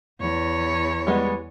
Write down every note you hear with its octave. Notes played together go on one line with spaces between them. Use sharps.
E2 C#5
G3 G#3 B3